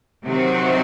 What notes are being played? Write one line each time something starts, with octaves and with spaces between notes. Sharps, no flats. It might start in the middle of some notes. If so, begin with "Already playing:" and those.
C3 D#3 F#3 C4 F#4